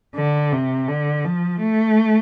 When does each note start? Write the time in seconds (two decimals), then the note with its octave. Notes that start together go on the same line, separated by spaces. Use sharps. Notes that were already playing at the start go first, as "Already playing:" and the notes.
0.15 D3
0.52 C3
0.88 D3
1.25 F3
1.60 A3